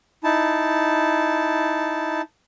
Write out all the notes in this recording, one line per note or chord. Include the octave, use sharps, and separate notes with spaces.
D#4 E4 A5